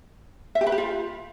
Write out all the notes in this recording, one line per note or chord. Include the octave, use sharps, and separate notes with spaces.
E5
G4
B4
G4
F4